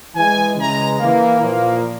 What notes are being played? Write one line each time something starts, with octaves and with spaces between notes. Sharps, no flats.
E3 G#3 G#5
C#3 E3 G#3 A#5
E3 A#3
A#2 F3 A#3